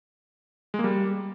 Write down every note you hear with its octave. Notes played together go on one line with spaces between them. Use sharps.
G#3
A#3
G3